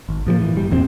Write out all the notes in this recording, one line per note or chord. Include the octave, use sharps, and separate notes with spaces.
G#1
A2 F3 G3 A#3
E3
G1 G3
G1 E2 A#2 C4